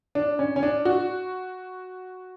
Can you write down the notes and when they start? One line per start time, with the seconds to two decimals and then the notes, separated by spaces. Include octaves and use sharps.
0.15 D4
0.39 C#4
0.56 C#4
0.63 D4
0.85 F#4